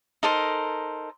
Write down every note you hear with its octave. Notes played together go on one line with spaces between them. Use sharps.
D#4 A4 A#4 C5